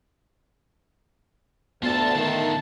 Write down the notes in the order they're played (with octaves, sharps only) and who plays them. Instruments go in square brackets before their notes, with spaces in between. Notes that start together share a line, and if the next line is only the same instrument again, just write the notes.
[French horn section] D2 [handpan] B3 [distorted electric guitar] F4 A4 [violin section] A5
[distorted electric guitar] D3 F4 [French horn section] D#3 A3